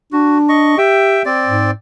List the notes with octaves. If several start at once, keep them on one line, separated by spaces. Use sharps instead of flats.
D4 F#4
D#5 C#6
G4 E5 G5
C4 D5
G#2